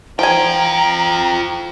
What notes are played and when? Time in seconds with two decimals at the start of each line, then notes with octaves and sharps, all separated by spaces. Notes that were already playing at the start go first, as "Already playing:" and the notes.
0.19 F3 F4 G5 G#5 A#5